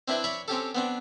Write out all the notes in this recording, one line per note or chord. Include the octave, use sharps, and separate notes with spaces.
C4 D4 E4 B4 C5 E5
C#5 D5 E5 B5 C#6
C4 C#4 G4 A4
B3 C4 D4